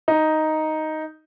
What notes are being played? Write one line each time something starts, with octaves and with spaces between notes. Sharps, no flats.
D#4